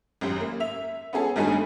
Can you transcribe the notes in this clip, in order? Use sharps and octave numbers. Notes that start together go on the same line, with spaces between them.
G#1 F#2 G4
A#3
E5 F7
B3 C#4 G#4 A4
G#1 G2 G3 A3 D#4 G#5